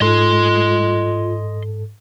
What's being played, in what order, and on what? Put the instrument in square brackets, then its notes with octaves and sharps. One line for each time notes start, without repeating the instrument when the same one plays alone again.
[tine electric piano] G#2 A4 [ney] F4 [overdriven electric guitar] D#5 C6